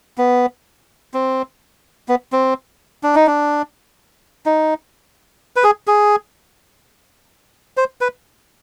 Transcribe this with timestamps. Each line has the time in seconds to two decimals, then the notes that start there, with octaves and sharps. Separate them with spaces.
0.18 B3
1.14 C4
2.08 B3
2.32 C4
3.03 D4
3.15 D#4
3.27 D4
4.46 D#4
5.56 B4
5.64 G#4
5.87 G#4
7.77 C5
8.01 B4